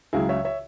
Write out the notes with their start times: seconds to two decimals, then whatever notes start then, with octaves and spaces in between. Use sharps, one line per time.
0.13 C#2 C#3 F#3 E4 G#4
0.29 C#5 E5
0.45 C#5 E5